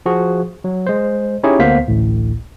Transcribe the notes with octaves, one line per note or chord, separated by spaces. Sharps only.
F3 F#4 G#4
F#3
G#3 C5
C#4 D#4 E4 G4 G#4 C#5
D2 A#3 B3 C5 F5 B6
A1 D2 A2